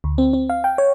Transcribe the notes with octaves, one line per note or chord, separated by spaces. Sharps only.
D2
C4
C4
F5
G5
C#5